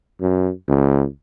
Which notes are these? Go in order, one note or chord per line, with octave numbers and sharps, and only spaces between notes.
F#2
C#2